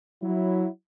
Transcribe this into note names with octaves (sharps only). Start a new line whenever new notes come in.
F#3 E4